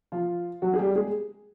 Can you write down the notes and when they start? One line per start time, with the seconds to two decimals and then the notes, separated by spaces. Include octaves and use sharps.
0.12 F3 F4
0.62 F#3 F#4
0.73 G#4
0.79 G3 G4
0.95 G#3 G#4